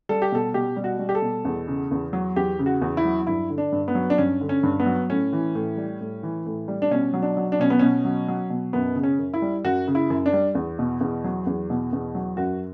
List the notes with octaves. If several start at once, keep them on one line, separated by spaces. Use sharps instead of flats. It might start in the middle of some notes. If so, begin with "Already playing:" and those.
G3 A4
G4
B2 A4
B2 G4
G3
F#4
G3
G4
A4
B2
E2
C#3
E2
F#3
E2 G4
C#3
F#4
E2
E4
F#3
G2 E4
D3
D4
G2
B3
F#3
D4
G2 C#4
D3
C#4
G2
B3
F#3
A2 C#4
E3
A2
G3
A2
E3
A2
G3
D4
B2 C#4
F#3
D4
F#3
D4
B2 C#4
B3
B2 C#4
F#3
F#3
B2
F#2 B3
C#3
C#4
F#2
E4
G3
F#2 F#4
C#3
E4
F#2
D4
G3
E2
B2
E2
F#3
E2
B2
E2
F#3
F#2 F#4